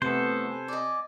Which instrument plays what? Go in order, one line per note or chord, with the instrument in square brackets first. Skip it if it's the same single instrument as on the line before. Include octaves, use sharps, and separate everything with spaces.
[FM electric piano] C3 [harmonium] E3 A3 B3 [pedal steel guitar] A4 C5 [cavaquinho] B4
[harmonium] G#5
[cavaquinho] D5 D#5